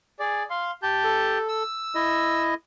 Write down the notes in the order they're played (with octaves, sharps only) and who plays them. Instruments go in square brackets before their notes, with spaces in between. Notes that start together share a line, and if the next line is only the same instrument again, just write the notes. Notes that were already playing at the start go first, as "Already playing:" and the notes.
[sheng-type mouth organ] G#4 D5
F5 C6
G4 A5 G6
[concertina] A4
[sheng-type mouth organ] E6
[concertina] E4 D#5